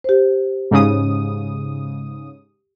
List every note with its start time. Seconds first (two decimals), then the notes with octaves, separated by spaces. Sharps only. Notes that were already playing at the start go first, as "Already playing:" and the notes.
0.04 G4 C5
0.71 G#2 C#3 D#6